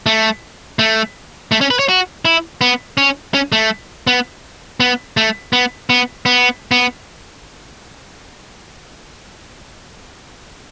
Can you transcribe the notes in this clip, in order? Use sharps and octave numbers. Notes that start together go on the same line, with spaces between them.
A3
A3
A3
C#4
B4
C#5
F#4
E4
B3
C#4
C#4
A3
B3
B3
A3
B3
B3
B3
B3